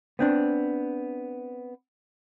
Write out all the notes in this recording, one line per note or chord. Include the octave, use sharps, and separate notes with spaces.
B3 C4 D4